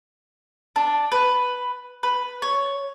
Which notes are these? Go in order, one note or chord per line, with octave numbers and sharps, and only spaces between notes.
D4
B4
B4
C#5